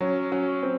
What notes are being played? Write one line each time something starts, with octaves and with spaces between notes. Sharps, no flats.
F#3 C#4
F#3 C#4
C4